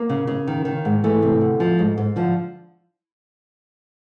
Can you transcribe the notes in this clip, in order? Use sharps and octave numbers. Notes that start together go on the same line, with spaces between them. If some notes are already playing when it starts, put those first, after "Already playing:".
Already playing: A#3
C#3
C#3
D#3
D#3
G#2
E3 A3
C3
D2
F3
G#2
G#2
D3 F3